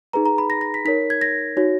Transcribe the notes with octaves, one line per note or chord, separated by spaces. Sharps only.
D#4 G#4 B4 A#5
A#5
B5
A#6
A#6
B6
D#4 A#4 C#5 B6
G#6
A#6
D#4 F#4 C#5